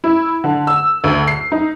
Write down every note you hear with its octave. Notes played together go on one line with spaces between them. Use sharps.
E4
D3
E6
D2
C7
D#4